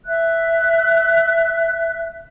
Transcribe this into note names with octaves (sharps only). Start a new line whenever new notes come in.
E5 F#6